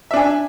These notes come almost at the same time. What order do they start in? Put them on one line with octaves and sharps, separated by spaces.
E5 D4 G#5